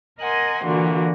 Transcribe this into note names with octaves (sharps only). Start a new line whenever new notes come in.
A#4 D#5 F#5 G#5 C6
A#2 D3 E3 F#4